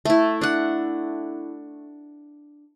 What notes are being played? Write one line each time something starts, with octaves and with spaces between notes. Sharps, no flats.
A3 E4
D4 F#5